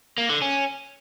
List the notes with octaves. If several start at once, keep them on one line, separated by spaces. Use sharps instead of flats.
A#3
D3
C#4